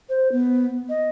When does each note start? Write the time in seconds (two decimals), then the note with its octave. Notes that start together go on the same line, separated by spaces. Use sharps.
0.09 C5
0.31 B3
0.89 D#5